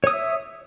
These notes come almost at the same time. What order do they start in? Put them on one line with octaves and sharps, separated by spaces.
C#5 D#6 E6 E5